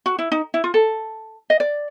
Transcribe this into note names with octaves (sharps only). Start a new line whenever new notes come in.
F#4
E4
D#4
E4
F4
A4
D#5
D5